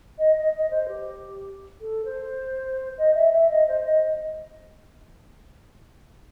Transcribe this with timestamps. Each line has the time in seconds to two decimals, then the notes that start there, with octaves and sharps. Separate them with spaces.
0.18 D#5
0.36 D#5
0.54 D#5
0.70 C5
0.88 G4
1.81 A4
2.05 C5
2.98 D#5
3.14 E5
3.33 E5
3.50 D#5
3.68 C5
3.85 D#5